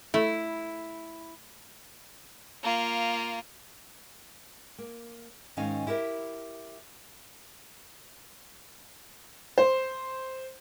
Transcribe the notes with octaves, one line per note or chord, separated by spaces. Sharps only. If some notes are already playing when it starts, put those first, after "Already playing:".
A3 E4
A#3 F4
A#3
G#2 D#3 C#4 D#4 F5 G#5
E4 G4 A#4 C#5 E5
C5